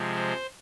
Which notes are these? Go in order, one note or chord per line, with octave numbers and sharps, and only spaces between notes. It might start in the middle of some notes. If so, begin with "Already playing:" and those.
Already playing: C3 F3 G#3
C5